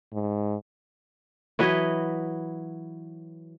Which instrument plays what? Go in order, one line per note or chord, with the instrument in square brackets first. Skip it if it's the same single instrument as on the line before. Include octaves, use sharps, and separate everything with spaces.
[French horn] G#2
[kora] E3 F#3 B4 D#5